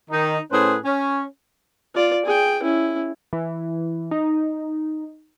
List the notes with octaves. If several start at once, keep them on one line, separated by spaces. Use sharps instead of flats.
D#3 D#4
A2 C#4 G#4 B4 C5
C#4
F4 D5
G#4 G5
C#4 E4
E3
D#4